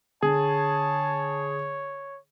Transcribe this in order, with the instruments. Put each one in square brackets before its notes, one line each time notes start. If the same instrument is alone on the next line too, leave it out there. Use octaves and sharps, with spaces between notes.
[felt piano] D3 [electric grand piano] G#4 [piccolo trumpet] C#5 [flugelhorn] A5